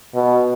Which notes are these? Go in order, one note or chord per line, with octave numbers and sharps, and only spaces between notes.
B2